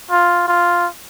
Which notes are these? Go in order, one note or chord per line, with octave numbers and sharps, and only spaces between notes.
F4
F4